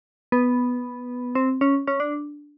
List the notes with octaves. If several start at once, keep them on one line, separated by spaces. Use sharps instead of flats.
B3
C4
C#4
C#4
D4